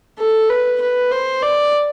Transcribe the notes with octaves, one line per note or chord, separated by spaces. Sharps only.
A4
B4
B4
C5
D5